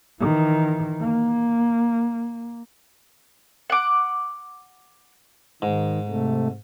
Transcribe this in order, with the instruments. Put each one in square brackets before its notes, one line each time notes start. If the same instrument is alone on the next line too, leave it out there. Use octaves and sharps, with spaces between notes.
[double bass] D#3 E3
A#3
[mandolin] F#5 D6
[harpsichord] G#2 [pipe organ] D#3
[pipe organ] C3 A3